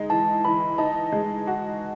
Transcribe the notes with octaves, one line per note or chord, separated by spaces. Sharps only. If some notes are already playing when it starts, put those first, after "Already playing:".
Already playing: G#3 D#4
E3 A5
E3 B5
D#4 A5
G#3
F#4